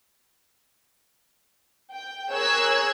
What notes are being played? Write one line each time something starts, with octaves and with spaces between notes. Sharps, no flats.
G5
G#4 A#4 C#5 E6 F#6 G#6